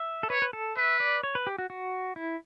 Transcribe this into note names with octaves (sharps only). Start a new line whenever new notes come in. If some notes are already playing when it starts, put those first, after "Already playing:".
Already playing: E5
A4
B4 C#5
B4
A4
B4 E5
D5
C#5
B4
G4
F#4
F#4
E4